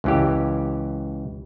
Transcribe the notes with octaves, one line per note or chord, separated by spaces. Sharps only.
C#2 E3 G4